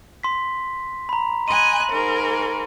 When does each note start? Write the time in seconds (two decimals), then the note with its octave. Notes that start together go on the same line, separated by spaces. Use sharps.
0.23 C6 B6
1.09 A#5 B5
1.48 D#5 G#5 B5 C6 F#6 D#7
1.90 G#2 A#4